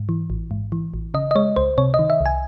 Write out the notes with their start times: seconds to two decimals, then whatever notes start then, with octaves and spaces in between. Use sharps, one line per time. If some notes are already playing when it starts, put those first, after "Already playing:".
Already playing: G#2
0.09 E3
0.30 A1
0.51 G#2
0.72 E3
0.94 A1
1.14 C#3 D#5
1.31 D#5
1.35 G#3 C#5
1.56 C#2 C5
1.78 C3 C#5
1.94 D#5
1.99 D#3
2.10 E5
2.21 C2
2.26 G#5